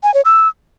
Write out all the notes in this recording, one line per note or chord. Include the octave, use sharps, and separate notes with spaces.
G#5
C#5
E6